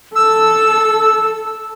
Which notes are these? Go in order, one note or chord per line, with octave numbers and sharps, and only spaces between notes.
A4 E6